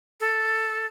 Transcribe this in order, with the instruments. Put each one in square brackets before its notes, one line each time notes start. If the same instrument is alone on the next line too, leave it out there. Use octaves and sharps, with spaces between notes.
[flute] A4